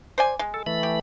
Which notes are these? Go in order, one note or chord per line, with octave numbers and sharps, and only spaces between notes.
C5 D5 G#5
G#3
A4
E3 A3 B5
G4